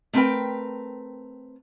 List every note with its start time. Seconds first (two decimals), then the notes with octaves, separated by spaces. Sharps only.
0.13 A3 C4 A#4 B4 G5